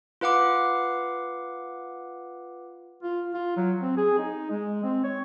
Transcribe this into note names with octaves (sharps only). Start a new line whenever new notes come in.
F4 B4 F5 F#5 D6
F4
F4
F#3
C4
G#4
D#4
G#3
C4
C#5